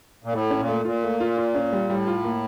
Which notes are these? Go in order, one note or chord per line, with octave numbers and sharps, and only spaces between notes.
A#2
A2 A3
C#4
A#2
A3
A#2 F4
A3
F4
F4
C#4
G3
A2 G3
F4
A#3